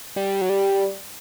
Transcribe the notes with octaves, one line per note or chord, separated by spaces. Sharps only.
G3
F#3
G3